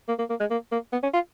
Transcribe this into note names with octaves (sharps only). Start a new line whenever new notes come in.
A#3
A#3
A#3
G#3
A#3
A#3
B3
C#4
F4